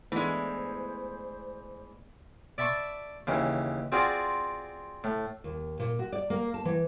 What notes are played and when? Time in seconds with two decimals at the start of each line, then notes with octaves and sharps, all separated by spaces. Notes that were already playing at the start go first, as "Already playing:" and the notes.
0.12 E3 G#3 A3 B3 D4 C5
2.58 D5 E5 A5 B5 C#6
3.27 D#2 C#3 E3
3.92 C4 F4 F#4 G#4 D5
5.04 A2
5.44 D#2
5.80 A#2
5.99 F#4
6.12 D5
6.30 A#3
6.54 A5
6.65 E3